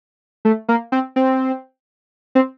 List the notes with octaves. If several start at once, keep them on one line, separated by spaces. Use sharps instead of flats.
A3
A#3
C4
C4
C4